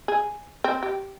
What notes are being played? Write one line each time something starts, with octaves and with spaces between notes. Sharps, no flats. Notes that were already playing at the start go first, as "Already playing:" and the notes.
G#4
C4
G4